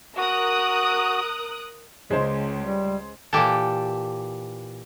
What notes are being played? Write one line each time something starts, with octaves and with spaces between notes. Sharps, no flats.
F#4 A#4 D#6 F#6
C#2 G#3 C5
G3
A#2 E3 G4 A4